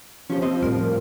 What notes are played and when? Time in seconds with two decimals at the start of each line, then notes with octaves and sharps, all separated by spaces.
0.30 F3 C#4 G4
0.42 C4 D#5
0.62 A2 G3 A#4